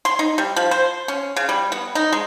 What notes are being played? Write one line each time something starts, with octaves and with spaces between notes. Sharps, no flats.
C6
D#4
G3
F3
C5
C#4
C#3
G3
B3
D#4
G#3